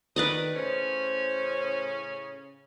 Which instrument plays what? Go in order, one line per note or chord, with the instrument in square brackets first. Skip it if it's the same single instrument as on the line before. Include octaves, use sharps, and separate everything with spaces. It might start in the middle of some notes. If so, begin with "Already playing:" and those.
[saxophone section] D#3 [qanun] B4 D5 D#5
[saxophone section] A2 C#3 C#4 [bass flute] C5